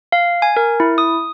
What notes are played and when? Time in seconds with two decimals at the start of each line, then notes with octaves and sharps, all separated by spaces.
0.12 F5
0.42 G#5
0.56 A#4
0.80 E4
0.98 D#6